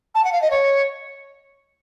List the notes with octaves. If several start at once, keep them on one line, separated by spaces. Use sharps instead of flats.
A5
F#5
F5
D#5
C#5